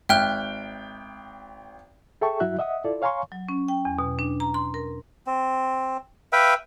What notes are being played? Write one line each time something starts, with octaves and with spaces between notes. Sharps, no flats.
G#1 E5 G5 F6 F#6
G#4 A4 E5 G5 A5 C#6
G2 F#3 E4 F#4 E5 F#6
D#5 E5 F#5 D#6
E4 F4 A4 D5
C#5 F5 G#5 A#5 C6 C#6
F#3
C#4
G5
E2
B2
D4
A#5
C6
A#4
C4
B4 E5 F5 G5